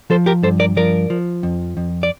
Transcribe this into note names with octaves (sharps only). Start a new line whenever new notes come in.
F3 A4 C5
G4 A#4
G2 A4 C5
A#4 D5
F3 A#4 D5
F3
F2
F2
D5